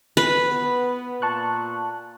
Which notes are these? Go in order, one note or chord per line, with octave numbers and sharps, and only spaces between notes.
B4
B3
A#2 A5 C#6 F#6